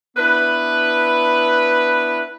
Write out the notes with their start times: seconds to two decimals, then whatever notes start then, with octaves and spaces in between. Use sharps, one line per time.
0.17 B3 D4 E4 B4